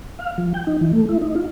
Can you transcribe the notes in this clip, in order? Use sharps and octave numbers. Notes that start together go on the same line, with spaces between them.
F5
F3
G5
D#4
E3
A3
E4
D#4
F4